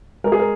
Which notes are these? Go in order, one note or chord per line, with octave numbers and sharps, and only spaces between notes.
G#3 A#4
G#4
A#4